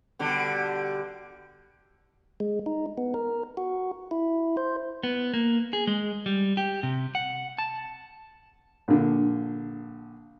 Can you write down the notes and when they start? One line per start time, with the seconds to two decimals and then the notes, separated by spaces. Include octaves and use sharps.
0.19 B2 D3 G3
2.40 G#3
2.66 D#4
2.98 B3
3.14 A#4
3.57 F#4
4.11 E4
4.57 C5
5.03 B3
5.34 A#3
5.73 G#4
5.87 G#3
6.26 G3
6.57 G4
6.83 C3
7.15 F#5
7.58 A5
8.88 A#1 D3